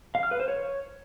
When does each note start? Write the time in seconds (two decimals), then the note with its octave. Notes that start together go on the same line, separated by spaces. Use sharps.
0.15 F5
0.23 F6
0.31 B4
0.40 C5
0.48 C#5